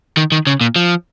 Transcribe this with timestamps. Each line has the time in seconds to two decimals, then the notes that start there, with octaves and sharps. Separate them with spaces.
0.17 D#3
0.32 D#3
0.47 C#3
0.61 A#2
0.76 F3